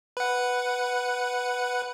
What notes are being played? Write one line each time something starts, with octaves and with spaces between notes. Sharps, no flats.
B4 F#5